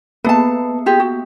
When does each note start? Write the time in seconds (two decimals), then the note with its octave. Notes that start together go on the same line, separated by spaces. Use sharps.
0.25 A#3 B3 B4 A5
0.86 F4 G4 G#4
1.00 F#4